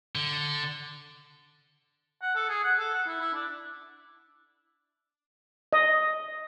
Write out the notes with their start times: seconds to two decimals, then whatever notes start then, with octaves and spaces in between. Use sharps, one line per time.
0.15 D3
2.22 F#5
2.35 A4
2.49 G#4
2.64 F#5
2.79 A4
2.94 F#5
3.07 E4
3.20 E4
3.34 D4
5.73 D#5